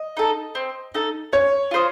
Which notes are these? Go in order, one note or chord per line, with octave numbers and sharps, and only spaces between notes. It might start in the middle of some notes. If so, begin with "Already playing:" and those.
Already playing: D#5
D#4 A4
C4
D#4 A4
C#4 C#5
F4 C5 D#5